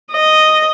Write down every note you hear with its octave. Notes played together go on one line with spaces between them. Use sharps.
D#5